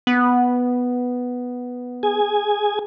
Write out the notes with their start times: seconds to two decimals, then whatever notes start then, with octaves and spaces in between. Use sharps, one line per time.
0.07 B3
2.03 G#4 G#5